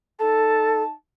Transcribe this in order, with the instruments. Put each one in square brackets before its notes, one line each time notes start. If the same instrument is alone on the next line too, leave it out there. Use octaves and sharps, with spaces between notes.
[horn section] D#4 A5 [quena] A4